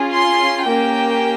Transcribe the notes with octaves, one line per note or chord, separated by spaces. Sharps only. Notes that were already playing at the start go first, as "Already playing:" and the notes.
Already playing: C#4 F4 G#4
C6
A#3 C#4 G4 G5